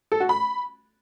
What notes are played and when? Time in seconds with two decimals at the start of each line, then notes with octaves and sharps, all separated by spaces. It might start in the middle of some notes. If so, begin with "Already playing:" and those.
0.12 A4
0.20 F#4
0.29 B5